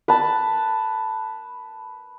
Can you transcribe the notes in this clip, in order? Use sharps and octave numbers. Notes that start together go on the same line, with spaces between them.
B4 A5